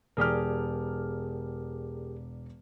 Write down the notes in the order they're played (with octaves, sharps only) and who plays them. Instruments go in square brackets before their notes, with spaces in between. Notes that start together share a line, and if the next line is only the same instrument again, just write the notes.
[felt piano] E1 D5 F6 [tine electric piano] G4 G#4 A#4